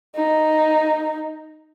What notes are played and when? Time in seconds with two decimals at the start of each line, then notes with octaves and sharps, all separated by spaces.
0.15 D#4